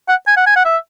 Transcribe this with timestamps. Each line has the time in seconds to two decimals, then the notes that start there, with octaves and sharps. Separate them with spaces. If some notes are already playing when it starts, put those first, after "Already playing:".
0.09 F#5
0.27 G#5
0.37 F#5
0.46 G#5
0.56 F#5
0.65 E5